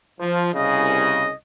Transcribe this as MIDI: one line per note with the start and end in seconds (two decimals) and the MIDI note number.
0.20 0.51 53
0.54 1.28 36
0.54 1.28 49
0.54 1.34 75